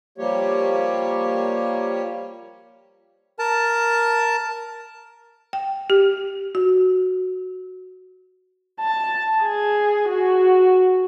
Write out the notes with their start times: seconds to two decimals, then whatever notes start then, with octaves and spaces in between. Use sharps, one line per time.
0.18 F3 G3 A#3 G4 C#5
3.39 A#4 A5
5.53 G5
5.90 G4
6.55 F#4
8.80 A5
9.44 G#4
10.10 F#4